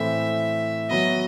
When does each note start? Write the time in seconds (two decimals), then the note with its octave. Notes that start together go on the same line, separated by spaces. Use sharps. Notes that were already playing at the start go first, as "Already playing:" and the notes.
Already playing: A2 E3 A3 C4 E5
0.90 F#3 B3 F#4 D#5